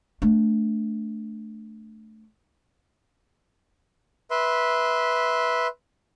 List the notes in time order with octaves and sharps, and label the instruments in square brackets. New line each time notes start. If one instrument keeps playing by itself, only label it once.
[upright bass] A3 D4
[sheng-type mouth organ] B4 E5 C6